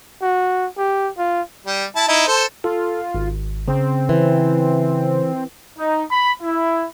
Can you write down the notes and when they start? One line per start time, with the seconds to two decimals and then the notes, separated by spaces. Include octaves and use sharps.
0.22 F#4
0.77 G4
1.18 F4
1.66 G3
1.96 E4 A5
2.08 D#4 E4
2.28 A4 C5
2.64 F4 A4
3.15 G#1
3.68 C#3 C4
4.09 E3
5.78 D#4
6.10 B5
6.41 E4